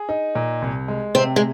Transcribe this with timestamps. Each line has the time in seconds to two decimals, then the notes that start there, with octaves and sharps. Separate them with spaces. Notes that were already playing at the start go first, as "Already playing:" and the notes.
Already playing: G#4
0.09 D#4
0.35 A#2
0.62 C2
0.88 G#3
1.15 C3 C4
1.36 G#3